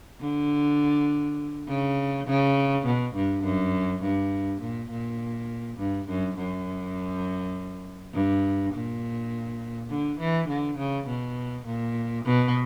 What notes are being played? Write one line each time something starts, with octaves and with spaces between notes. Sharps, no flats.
D3
C#3
C#3
B2
G2
F#2
G2
A#2
A#2
G2
F#2
F#2
G2
A#2
D3
E3
D3
C#3
B2
A#2
B2